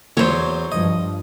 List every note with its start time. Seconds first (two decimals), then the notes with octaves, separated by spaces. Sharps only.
0.17 E2 F#3 C5 C#5
0.72 G2 F3 D#5